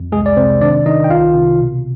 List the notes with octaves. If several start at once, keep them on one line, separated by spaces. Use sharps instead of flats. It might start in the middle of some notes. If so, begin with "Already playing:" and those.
Already playing: F2
C2 G#3 G#4
D5
C3 C4 C5
D#3 D4 D5
D#3 D#4 D#5
G5
C2 F4 F5
C3
B2